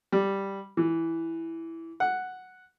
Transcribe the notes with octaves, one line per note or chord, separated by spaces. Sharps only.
G3
E3
F#5